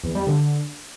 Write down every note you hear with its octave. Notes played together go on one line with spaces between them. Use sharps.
E2
G3
D3